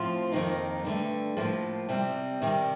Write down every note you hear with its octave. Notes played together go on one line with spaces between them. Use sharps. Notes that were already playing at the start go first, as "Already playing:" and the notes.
Already playing: A2 F3 C4 F4
F2 D#3 A#3 D#4
G2 D3 A3
A2 F3 A#3
C3 G3 C4
C3 D#3 G3